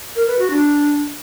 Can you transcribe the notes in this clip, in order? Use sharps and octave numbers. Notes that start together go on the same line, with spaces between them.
A#4
B4
F#4
D4